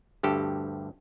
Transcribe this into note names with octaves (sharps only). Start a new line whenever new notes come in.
D2 G2 G4 A4